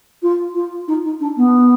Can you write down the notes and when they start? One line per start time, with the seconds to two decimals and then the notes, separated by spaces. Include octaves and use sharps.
0.23 F4
0.55 F4
0.88 D#4
1.04 D#4
1.20 D4
1.37 B3